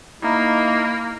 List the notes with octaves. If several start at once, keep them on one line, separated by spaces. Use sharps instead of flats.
A#3 D#4 E4